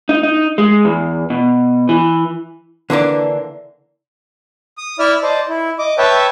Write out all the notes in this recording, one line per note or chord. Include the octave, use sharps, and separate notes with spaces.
D#4
D#4
G#3
E2
B2
E3
D3 E3 A#3 D4
D#6
E4 D5 E5 F6
C5 D5 D#5 A5
E4
D#5 D6
B4 C#5 E5 G5 A5